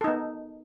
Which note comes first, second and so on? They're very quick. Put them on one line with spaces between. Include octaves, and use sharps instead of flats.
A4 D#4 B3